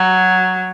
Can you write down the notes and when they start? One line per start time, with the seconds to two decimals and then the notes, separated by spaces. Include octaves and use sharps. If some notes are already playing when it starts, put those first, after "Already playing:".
Already playing: F#3